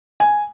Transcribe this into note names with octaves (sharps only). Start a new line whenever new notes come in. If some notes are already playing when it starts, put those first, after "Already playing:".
G#5